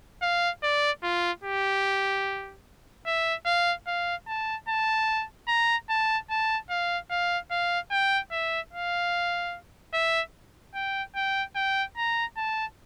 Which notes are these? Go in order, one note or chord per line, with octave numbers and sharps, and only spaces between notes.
F5
D5
F4
G4
E5
F5
F5
A5
A5
A#5
A5
A5
F5
F5
F5
G5
E5
F5
E5
G5
G5
G5
A#5
A5